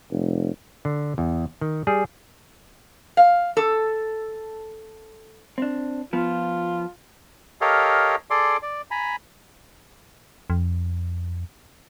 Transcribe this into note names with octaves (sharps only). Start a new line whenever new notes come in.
F1
D3
E2
D#3
G3 G#4
F5
A4
C4 D4
F3 B3 F4
G4 A4 A#4 C#5 D#5 F5
G#4 A4 D5 C6 D6
D5
G#5 A#5 B5
F2